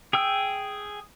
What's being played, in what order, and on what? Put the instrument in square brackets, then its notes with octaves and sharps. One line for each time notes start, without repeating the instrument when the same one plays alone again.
[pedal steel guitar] G#4 G5 E6